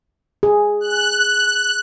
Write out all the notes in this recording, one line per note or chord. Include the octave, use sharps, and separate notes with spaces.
G#4
F#6